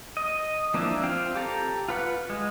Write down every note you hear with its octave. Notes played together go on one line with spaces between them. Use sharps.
D#5
F3 A#3 C4 D4 E4
C4 F4 F5 G5
G4 A4 A#5
F4 B4 F#5
G#3